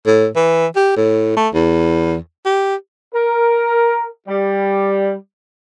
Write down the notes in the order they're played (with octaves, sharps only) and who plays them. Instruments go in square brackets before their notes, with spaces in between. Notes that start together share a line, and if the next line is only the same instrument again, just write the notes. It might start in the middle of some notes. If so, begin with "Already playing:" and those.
[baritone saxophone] A2
E3
G4
A2
A3
E2
G4
[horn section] A#4
G3